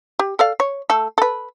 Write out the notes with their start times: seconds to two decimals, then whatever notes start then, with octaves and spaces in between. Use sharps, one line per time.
0.19 G4
0.39 A4 D5 F5
0.60 C#5
0.90 A3 A4
1.18 A4 B4